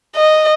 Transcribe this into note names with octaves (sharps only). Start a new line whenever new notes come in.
D#5